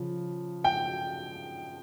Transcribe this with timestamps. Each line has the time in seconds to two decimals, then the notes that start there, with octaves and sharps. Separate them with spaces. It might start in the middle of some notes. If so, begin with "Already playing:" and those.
Already playing: C#3 F3
0.64 G5